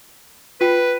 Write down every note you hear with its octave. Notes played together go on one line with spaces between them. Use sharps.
F4 B4 G5